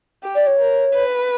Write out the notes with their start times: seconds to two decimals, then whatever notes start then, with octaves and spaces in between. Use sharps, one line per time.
0.23 G4
0.35 D5
0.47 C#5
0.59 A#4
0.94 B4